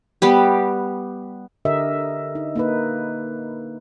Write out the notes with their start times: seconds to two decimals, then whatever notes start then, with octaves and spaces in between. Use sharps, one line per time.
0.22 G3 B3 G4
1.65 D3 G4 A#4 D#5 E5
2.35 D#4
2.56 A#3 D#4 B4